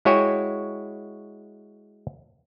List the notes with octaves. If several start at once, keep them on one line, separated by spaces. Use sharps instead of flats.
G#3 E4 F#4 C#5 G5 G#5